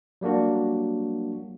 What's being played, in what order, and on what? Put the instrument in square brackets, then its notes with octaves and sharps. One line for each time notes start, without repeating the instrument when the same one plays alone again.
[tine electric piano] F#3 G3 A#3 D4 F#4